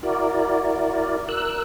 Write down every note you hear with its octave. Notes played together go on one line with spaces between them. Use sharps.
E4 F#4 A#4 D5
A#4 E6 F#6